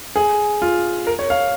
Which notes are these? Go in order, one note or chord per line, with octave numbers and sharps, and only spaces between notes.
G#4
F4
A#4
C#5
F5